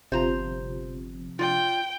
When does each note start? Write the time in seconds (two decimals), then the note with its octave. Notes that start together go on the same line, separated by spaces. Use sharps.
0.12 G1 C3 F3 C5 A#5
1.39 F4 D5 G5